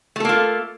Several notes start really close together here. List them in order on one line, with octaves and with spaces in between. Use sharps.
A3 A4 A#3 F4